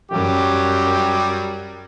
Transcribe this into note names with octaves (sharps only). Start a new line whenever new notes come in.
F#2 F#3 G3 G4